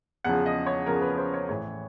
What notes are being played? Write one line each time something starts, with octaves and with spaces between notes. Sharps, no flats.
E2 C#3 F3 F#5
D#5
C#5
E2 C#3 F3 A#4
B4
C5
C#5
A1 A2 E3 C#5